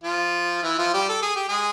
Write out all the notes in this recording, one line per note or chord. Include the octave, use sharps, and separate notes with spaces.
F3 F4
E3 E4
F3 F4
G3 G4
A4
G#4
G4
G#3 G#4